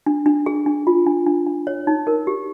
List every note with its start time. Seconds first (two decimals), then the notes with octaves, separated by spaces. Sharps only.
0.06 D4
0.26 D4
0.46 G#4
0.66 D4
0.87 F4
1.06 D4
1.26 D4
1.47 D4
1.67 C#5
1.87 D#4
2.07 A#4
2.27 G4